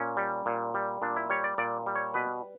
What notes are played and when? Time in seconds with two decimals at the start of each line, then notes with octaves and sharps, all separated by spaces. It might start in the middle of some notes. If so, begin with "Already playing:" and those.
Already playing: A#2 C#4
0.17 G3
0.46 A#2
0.74 G3
1.02 A#2 D4
1.16 E4
1.30 G3 C#5
1.44 D5
1.58 A#2 D5
1.86 G3
1.95 C#5
2.14 B2 B4